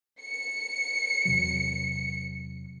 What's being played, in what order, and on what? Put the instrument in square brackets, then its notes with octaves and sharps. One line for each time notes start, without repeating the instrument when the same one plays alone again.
[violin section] C#7
[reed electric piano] E2 C3 F#3